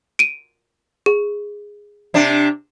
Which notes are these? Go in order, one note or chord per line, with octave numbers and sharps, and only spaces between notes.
D7 D#7
G#4
C3 D4